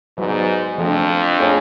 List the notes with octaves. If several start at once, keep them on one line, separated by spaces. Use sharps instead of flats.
G#2 F#3 B3 F#4 B4 D5
F2 F3 A3 D4
A3 D4 G#4 C#5